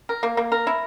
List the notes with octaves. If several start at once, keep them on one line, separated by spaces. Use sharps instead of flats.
A#4
A#3
A#3
A#4
E4